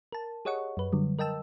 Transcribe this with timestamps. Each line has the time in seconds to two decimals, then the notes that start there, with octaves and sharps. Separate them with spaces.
0.12 A#4 A5
0.45 G4 G#4 C#5 D#5 F#5 C#6
0.77 F#2 B4
0.93 D3 F#3 G3
1.19 A#4 D#5 G5 A5 E6